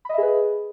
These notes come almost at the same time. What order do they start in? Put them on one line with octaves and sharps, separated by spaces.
B5 D#5 E5 G#4 B4